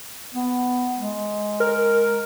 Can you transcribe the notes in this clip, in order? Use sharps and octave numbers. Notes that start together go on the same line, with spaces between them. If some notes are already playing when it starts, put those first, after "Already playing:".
B3
G#3
A#4